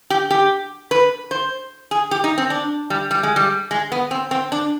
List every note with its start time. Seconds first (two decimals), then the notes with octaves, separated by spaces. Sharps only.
0.10 G4
0.31 G4
0.91 B4
1.31 C5
1.91 G#4
2.11 G4
2.24 D#4
2.38 C4
2.50 D4
2.90 G3
3.11 G3
3.23 G#3
3.36 G3
3.71 G#3
3.92 B3
4.11 C4
4.31 C4
4.52 D4